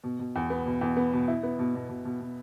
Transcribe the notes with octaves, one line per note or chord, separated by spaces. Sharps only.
B2
B2
E2
B3
B2
E2
B3
B2
E4
B3
B2
B2
B2
B2
B2